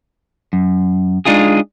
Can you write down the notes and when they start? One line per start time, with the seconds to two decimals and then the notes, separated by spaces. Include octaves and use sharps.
0.53 F#2
1.25 G#3 D4 D#4 F4 G#4